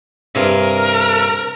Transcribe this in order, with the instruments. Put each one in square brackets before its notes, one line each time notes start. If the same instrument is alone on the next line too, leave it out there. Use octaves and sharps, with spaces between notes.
[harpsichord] G2 C3 G#4 [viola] A#4